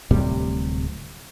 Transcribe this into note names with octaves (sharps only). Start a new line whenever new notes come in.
D1 A2 C3 G3